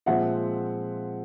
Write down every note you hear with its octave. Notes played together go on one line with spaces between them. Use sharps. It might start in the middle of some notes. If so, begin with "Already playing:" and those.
A#2 F3 G#3 C4 E5 F#5